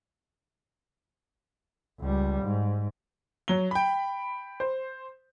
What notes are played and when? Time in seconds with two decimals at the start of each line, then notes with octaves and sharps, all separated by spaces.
1.99 C#2 G3
2.43 G#2
3.48 F#3 G7
3.71 G5 B5
4.60 C5